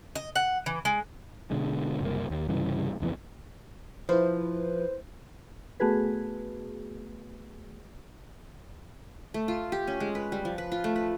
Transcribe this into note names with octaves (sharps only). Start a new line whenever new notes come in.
D#5
F#5
E3
G#3
B2 D3 G#3
F#1 C2 C3 A#3
D#2
C2 G2 C#3 E3
F#1 F2 E3 B3
F3 E4 B4 C5
A3 B3 F#4 G#4 B4
A3
F4
G4
C#4
G#3
B4
G3
F3
B4
F4
A3
B4